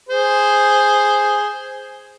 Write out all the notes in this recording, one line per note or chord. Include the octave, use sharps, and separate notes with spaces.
G#4 C5